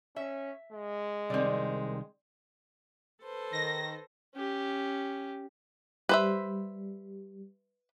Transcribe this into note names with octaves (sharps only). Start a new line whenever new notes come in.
C#4 E5
G#3
C2 D#3 C4 D5
A4 B4 C5
D#3 A#6
C#4 G4
G3 B4 C5 E5